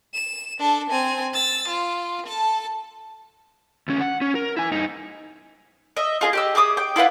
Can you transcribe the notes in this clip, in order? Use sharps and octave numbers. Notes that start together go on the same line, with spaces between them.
E7
D4 A4
C4 G#5
E6 A6
F4
A4 A5
D2 C#4
F#5
C#4
A#4
E4 G#5
G2 D#4
D#5 E5
F4 G#4 D#5
G4 D#5 E6
G#4 E5 D6 D#6
G5
E4 F4 B4 F#5